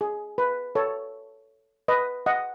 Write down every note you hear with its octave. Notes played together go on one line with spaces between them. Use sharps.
G#4
B4
A4 C#5
B4 D#5
D#5 F#5